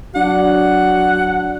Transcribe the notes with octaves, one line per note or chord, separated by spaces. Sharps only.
F#3 D4 F#4 F#5